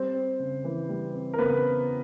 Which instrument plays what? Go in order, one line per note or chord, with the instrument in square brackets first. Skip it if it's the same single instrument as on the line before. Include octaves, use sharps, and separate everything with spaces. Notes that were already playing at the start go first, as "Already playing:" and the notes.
Already playing: [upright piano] G3 C4 C5
C4
C#3
E3
G3
C4
A#4
C#3 B3 B4